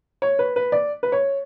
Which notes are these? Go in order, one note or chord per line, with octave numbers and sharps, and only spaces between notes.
C#5
B4
B4
D5
B4
C#5